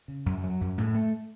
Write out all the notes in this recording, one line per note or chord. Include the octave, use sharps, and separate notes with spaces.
C#3
F#2
F#3
F#2
A2
A3